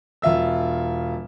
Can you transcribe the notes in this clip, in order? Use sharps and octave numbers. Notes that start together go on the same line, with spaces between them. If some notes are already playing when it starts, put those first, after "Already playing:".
E1 F4 E5 E6